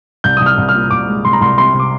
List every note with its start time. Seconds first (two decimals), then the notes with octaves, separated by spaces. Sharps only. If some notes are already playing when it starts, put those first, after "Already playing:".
0.24 C2 G6
0.37 C2 D#6
0.46 F6
0.58 C2
0.69 F6
0.74 A#2
0.91 C2 D6
1.07 G#3
1.25 C2 C6
1.33 A#5
1.41 C2 C6
1.58 C3 C6
1.74 C3
1.80 D6